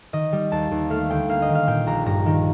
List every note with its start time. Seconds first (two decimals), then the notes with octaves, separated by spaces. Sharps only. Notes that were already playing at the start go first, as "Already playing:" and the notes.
0.13 D#3 D#5
0.32 G3
0.52 D#2 A5
0.71 D#2
0.90 A3 F5
1.10 D2 G5
1.29 A#3 F5
1.42 D#5
1.48 D#3
1.55 F5
1.67 A#2 G5
1.87 A#1 A#5
2.06 G2 A#5
2.26 D#3